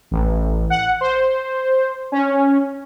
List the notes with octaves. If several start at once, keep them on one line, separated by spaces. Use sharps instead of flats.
A1
F#5
C5
C#4